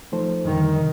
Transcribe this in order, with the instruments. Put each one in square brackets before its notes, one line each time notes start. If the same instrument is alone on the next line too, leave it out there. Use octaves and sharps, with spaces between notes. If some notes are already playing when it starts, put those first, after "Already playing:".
[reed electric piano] F3 A3 D#4 A4 C5
[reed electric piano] F2 D3 G3 [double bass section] D#3
[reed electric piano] C3